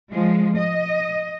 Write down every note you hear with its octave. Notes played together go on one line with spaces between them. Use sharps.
F3 G#3
D#5